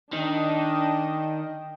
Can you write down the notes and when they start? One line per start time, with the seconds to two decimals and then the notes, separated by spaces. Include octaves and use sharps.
0.13 D#3 D4 D#5 G5